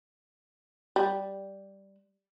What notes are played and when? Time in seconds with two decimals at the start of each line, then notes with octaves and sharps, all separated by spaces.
0.96 G3